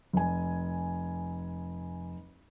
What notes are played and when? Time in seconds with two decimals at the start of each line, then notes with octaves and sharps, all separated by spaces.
0.13 F1 G#5